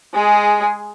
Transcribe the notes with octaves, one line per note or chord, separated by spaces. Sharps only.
G#3 G#4